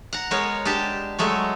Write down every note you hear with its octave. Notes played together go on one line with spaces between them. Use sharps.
F#5 A#5
G#3 B3 A#4 C#5
G#3 D4 G4 A5
F#3 G#3 A3 C#5